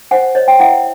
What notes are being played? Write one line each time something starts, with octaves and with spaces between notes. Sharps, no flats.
C5 F#5 G#5
C5 C#5 D#5
G5
E4 E5 F#5